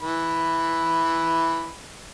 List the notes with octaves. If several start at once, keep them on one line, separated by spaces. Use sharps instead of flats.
E3 B5